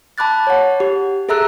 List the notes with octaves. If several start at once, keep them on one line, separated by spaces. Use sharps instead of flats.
A5 B5 D6 F#6 A6
C#5 F#5
G4
G#4 A4 E5 A#5 E6 F#6